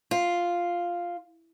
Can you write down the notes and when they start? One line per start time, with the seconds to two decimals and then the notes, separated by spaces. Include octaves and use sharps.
0.11 F4